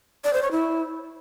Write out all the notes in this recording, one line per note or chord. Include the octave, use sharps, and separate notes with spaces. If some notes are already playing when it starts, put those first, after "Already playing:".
D5
C5
C#5
E4